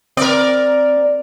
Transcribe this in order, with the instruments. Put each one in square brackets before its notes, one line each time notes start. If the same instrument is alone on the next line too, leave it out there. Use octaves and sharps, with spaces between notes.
[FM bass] C4 [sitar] A#4 D5